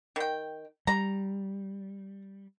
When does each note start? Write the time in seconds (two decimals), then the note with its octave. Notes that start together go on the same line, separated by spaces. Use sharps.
0.16 D#3 G5
0.87 G3 A#5